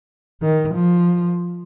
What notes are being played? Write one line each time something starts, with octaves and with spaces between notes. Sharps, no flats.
D#3
F3